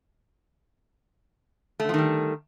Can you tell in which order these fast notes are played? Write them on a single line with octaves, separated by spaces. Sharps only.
A3 D3 F3 D#3 G3